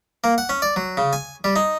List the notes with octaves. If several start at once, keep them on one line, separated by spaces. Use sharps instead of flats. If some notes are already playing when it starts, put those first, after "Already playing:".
A#3
F#5
C#4
D5
F#3
C#3
G#5
G3
D#4